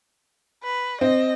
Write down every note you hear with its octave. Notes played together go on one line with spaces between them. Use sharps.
B4
C4 D#5